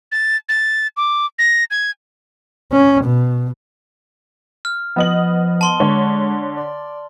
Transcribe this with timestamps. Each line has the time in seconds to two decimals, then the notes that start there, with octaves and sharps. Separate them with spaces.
0.12 A6
0.49 A6
0.97 D6
1.39 A#6
1.71 G#6
2.72 C#4
3.05 B2
4.65 F6
4.96 F3 B3 D#5 F#7
5.61 A5 C6 G7
5.80 D3 G#3 C#5
6.57 D5